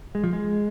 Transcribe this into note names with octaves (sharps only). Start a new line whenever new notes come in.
G#3
F3
G#3